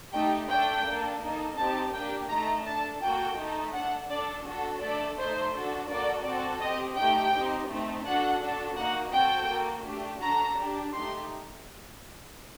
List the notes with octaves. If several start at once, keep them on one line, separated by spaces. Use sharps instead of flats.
A3 D#4 G4 G5
A3 D4 A4 G5
A#3 D4 A4
A#3 D#4 A4
C4 D#4 G4 A5
A#3 D4 G4 G5
A3 D#4 A4 A#5
D4 A4 A5
A#3 F#4 A4 G5
A3 D#4 A4
D4 A4 F#5
D4 A4 D5
D4 F#4 A4
A3 D4 A4 D5
A3 D#4 A4 C5
D4 F#4 A4
A#3 F#4 A4 D5
C4 F#4 A4 D5
C4 G4 D#5
A3 D#4 G4 G5
C4 D#4 G4
A3 C4 D#4
D4 F#4 A4 F#5
D4 F#4 A4
A#3 D#4 F#4 F#5
C4 F#4 A4 G5
A#3 F#4 A4
A3 D4 G4
D4 F#4 A4 A#5
D4 G4
A3 D#4 G4 C6